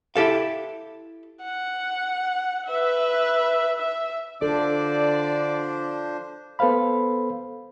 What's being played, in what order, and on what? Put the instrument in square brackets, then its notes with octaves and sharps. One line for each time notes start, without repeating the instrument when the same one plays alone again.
[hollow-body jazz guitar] E4 G4 A4 F5
[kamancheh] F#5
B4 E5
E5
[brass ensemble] D3 [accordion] F3 D4 C5 [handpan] A4 [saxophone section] D5
[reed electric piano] B3 A4 B4 C5 F5 B5